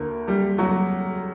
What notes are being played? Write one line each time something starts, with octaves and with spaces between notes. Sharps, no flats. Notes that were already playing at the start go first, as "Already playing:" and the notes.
Already playing: D2 D3 A#3 A#4
G3 G4
F#3 F#4